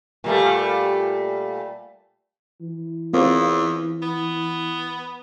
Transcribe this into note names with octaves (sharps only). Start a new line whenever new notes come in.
A#2 G3 A3
E3
E2 C4 F4 A#4
B3